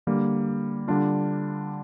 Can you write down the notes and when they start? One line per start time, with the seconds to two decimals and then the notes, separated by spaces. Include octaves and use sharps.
0.07 D3 G3 A#3
0.88 D3 G3 D4 F4